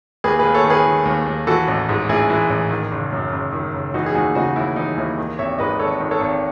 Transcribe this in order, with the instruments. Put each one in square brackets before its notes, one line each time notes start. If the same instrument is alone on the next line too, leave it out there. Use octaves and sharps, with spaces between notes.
[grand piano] D#2 G#4 B4
G#4 B4
D#2
A4 C#5
D#3
G#4 B4
D#3
D#2
D#2
E3 F#4 A4
A1
G#2
A1 E4 G#4
E3
A1
D#3
F#1
F#2
F#1
D#3
F#1
E3 D#4 F#4
G#4
D#2 D#4 F#4
C#3 D#4 F#4
D#2 E4
E3 D#4
D#2 E4
D#3
G#1 C#5 E5
G#2 B4 D#5
G#1 A4 C#5
D#3
A4 C#5
G#1